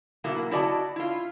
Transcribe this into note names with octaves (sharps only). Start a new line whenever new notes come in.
B2 F#3 A#3 E4
E4 F#4 D5 D#5 G5 A5
E4 F4